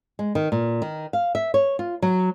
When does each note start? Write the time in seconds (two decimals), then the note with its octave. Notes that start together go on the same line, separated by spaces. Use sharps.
0.19 G#3
0.35 D#3
0.52 A#2
0.82 D#3
1.13 F5
1.35 E5
1.54 C#5
1.79 F4
2.02 F#3